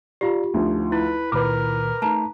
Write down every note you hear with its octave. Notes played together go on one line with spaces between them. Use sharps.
F4 G4 D5 F5 A#5
D2 F3 D#4
E4 B4
C#2 A#2 D#3 A#4 B4 B5 D6
A3 D#4 A5 A#5